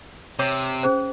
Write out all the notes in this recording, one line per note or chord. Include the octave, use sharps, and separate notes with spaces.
C3 C#5 D6
C#4 G#4 C5